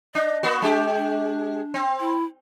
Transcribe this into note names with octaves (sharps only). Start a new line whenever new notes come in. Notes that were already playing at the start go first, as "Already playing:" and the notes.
D4 D#5
A#3 B3 F#4
G#3 D4 G4
D4
C4
E4